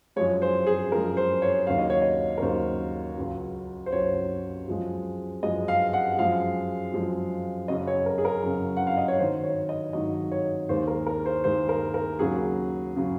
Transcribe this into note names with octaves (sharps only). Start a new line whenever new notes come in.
F#2 F3 G#3 C#5
C5
G#4
F#2 F3 G#3 A#4
C5
C#5
D#2 C#3 F#3 F5
D#5
C#5
D#5
A#4
D#2 C#3 F#3 C5
C#2 C#3 F#3
C5
C#2 C#3 F#3 C#5
F#2 F3 G#3
F#2 F3 G#3 D#5
F5
F#5
F#2 F3 G#3 F5
F#2 F3 G#3
F#2 C#3 F#3 D#5
C#5
A#4
G#4
A#4
F#2 C#3 F#3
F#5
F5
D#5
C#5
G#2 D#3 F#3 C5
C#5
D#5
G#2 D#3 F#3 D#5
C#5
D#2 D#3 G#3 C5
A#4
A#4
C5
D#2 D#3 G#3 C5
A#4
A#4
D#2 C#3 F#3 G#4
C#3 F#3